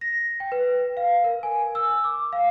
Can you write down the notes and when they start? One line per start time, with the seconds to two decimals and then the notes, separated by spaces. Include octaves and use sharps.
0.01 A#6
0.40 G5
0.52 B4
0.97 F5
1.24 A#4
1.43 G#5
1.75 E6
2.04 D6
2.33 F5